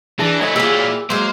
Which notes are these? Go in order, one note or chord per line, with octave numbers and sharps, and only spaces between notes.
E3 D4 G#4 A5 A#6
F#3 A3 E4 D#5 G#5
A#3 F4 G4 G#4 E6
F#3 G#3 A#3 C5